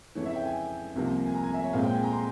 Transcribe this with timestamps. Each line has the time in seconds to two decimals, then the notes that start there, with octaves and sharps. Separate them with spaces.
0.15 F2 C#3 E3 C#5
0.25 E5
0.36 G5
0.45 G#5
0.95 C2 C3 F3 A#3
1.26 G#5
1.34 A#5
1.44 G#5
1.54 E5
1.64 C#5
1.73 A#2 G#3 C4 F5
1.84 G5
1.94 G#5
2.04 A#5
2.13 C6